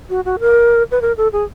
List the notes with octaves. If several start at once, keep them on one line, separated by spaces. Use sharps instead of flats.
F#4
F#4
A#4
B4
A#4
A4
G#4